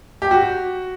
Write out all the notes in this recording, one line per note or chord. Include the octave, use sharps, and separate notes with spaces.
G4
F#4